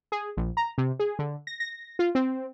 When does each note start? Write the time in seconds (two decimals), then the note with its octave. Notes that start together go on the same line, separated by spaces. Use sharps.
0.12 G#4
0.37 A#1
0.57 A#5
0.78 C3
0.99 G#4
1.19 D3
1.47 A#6
1.60 A#6
1.99 F4
2.15 C4